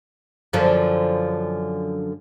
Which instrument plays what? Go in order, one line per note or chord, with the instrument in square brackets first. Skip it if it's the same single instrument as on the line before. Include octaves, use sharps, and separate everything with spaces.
[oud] F#2 D3 F3